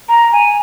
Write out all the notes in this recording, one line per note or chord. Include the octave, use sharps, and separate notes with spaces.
A#5
G#5